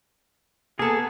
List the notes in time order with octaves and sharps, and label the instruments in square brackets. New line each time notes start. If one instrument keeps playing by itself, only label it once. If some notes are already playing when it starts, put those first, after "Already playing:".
[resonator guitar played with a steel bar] A#3 A4 [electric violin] B3 [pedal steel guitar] G#4